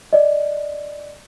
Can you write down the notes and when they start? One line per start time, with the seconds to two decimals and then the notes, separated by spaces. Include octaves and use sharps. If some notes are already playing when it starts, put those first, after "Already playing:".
0.13 D5 D#5